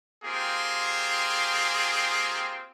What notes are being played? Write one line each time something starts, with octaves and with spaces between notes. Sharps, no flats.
A#3 C4 F4 G4 G#4